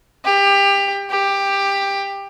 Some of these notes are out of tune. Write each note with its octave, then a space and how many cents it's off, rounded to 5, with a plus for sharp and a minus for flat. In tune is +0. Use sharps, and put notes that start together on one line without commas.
G4 +25
G4 +15